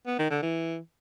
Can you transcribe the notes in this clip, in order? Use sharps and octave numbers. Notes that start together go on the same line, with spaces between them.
B3
D#3
D3
E3